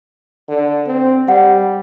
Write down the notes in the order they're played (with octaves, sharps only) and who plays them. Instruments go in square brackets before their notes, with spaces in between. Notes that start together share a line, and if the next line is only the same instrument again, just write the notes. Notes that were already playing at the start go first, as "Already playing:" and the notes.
[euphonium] D3
C4
[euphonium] G3 [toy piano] F#5